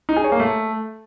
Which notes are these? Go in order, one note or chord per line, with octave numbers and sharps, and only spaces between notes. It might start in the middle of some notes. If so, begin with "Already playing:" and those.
D#4
G#4
C#5
A#3
A3